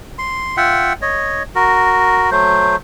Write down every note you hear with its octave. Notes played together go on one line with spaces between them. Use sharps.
C6
F4 E5 F#5 G5
C#5 D#5
F#4 A#4
F#3 A3 C5